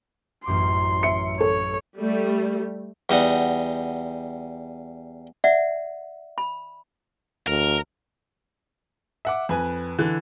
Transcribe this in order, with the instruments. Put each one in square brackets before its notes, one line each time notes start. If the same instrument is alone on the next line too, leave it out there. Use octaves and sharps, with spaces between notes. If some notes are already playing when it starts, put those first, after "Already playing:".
[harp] A1 F#2 D6 [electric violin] C6
[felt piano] E5 C#7
[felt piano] A4 [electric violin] C#5
[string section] G3 A3
[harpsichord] E2 G3 D#4 F#5
[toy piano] D5 E5 F#5
B5
[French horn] D2 [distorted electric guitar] A#4
[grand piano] E5 F#5 D6
F2 B4 G#5
D3 E3